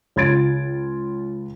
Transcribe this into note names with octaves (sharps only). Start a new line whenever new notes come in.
C#2 F4 G#6 A6 D7